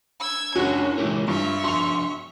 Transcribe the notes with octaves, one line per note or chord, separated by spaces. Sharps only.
E6 G#6
F#1 C#4 D4 E4 F#4 G#5
A#2 E3 G#3 G4 A#4
G2 F4 E5 C#6
F3 D4 F#4 C6 F7